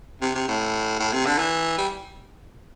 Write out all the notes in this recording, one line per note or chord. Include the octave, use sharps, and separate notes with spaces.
C3
C3
A2
A2
C3
D3
E3
G3